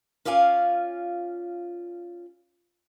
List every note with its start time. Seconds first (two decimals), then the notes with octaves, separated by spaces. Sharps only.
0.25 C#4 F4 D5 F5 G#5